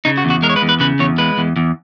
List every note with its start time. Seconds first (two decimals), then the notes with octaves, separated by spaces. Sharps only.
0.05 C#3 D#4
0.17 F#4
0.25 E2
0.30 F#4
0.43 G#3 A#4
0.49 C#5
0.56 B4
0.62 E2
0.69 B4
0.80 C#3 B4
0.99 E2 C#5
1.18 G#3 B4
1.38 E2
1.56 E2